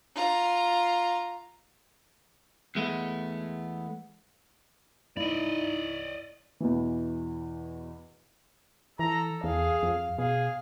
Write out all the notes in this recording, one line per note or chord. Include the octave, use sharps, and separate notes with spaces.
F4 A#5
E2 G#3 A3 B3
D#4 E4 D5 D#5
E2 B2 E3
E3 A4 A#5
E2 G#4 F5
F2
B2 G#4 F5